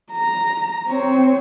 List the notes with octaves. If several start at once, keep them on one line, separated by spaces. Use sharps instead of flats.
A#5
C4 C#5